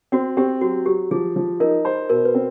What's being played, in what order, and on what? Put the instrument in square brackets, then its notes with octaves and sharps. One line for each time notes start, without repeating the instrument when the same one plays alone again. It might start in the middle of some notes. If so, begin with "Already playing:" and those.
[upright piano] C4 [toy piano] F#4
[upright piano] C4 [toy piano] G4
[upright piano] F#3 [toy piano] F#4
[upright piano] F#3 [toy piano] G4
[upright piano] F3 [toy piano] G#4
[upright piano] F3
[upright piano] D#4 [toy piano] A#4
[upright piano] C5
[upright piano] B2 [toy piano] A#4
[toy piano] B4
[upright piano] C4